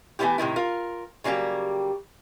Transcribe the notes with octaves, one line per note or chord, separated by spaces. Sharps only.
E3 A3 B3 C#4 E4 G4
A2 C3 D#3 E4
F4 A#4
C#3 F#3 G3 A#3 G4